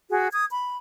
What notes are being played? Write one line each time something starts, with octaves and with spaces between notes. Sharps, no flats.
F#4 G#4
D#6 G#6
B5